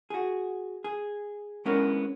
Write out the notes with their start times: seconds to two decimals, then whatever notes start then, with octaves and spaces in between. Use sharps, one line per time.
0.10 F#4 G#4
0.84 G#4
1.65 G#3 B3 C#4 D4 E4 A#4